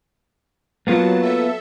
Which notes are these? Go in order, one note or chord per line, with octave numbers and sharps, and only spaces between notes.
F#3 A#3 B3 F4 A5
A4 E5